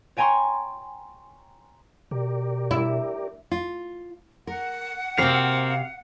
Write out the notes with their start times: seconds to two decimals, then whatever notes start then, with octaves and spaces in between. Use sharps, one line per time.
0.17 C#5 G5 G#5 A#5 C6 C#6
2.11 B2 G4 A#4 D5
2.71 E4
3.52 F4
4.47 A#4 F#5
5.18 C3 A#3 C4 F#4 F5